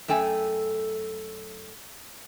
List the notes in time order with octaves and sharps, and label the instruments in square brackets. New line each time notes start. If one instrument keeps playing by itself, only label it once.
[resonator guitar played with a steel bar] F#2 A3 A4 G5 G#5